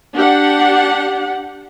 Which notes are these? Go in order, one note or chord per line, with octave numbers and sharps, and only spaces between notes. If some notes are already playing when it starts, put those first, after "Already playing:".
D4 G4 F#5